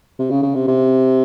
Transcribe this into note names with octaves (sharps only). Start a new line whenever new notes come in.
C3
C#3
C#3
C3
C3